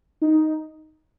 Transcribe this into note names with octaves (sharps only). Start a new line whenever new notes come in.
D#4